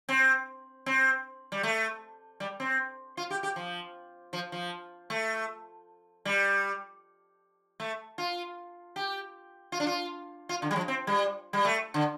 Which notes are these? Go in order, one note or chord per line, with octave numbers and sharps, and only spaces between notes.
C4
C4
G3
A3
G3
C4
F4
G4
G4
F3
F3
F3
A3
G3
A3
F4
G4
F4
D4
F4
F4
D3
G3
F3
C4
G3
G3
A3
D3